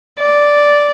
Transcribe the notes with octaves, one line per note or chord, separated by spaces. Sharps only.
D5